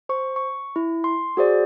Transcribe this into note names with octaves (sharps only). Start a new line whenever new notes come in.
C5 C#6
C#6
E4
C6
F#4 G#4 C5 D5